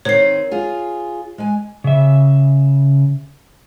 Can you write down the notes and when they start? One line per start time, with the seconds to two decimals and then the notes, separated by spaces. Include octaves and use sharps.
0.05 D#3 C4 C#5 C7
0.51 F4 G#4
1.38 G#3 G#5
1.84 C#3 E5